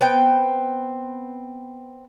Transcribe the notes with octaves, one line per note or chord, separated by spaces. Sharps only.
B3 C4 G5